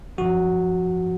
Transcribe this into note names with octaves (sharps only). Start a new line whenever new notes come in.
F#2 F3 F#4